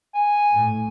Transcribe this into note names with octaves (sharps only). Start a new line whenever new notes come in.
G#5
A2